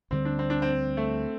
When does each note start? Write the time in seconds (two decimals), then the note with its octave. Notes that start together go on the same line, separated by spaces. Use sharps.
0.11 D2 D3 G3 C4
0.25 D4
0.39 C4
0.50 D4
0.62 C4
0.97 A3